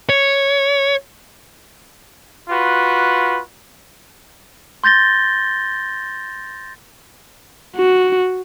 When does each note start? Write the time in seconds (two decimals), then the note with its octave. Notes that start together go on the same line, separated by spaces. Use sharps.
0.09 C#5
2.50 F4 F#4 B4
4.84 C6 G6 A6 A#6 G7
7.76 F#4